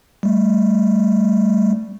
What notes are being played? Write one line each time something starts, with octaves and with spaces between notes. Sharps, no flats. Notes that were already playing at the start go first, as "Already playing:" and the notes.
G3 A3